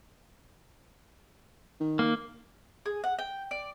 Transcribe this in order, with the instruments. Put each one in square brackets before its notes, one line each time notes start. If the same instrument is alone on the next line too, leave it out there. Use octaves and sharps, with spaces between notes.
[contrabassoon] D#3
[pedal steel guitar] A#3
[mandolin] G#4
F#5
G5
D5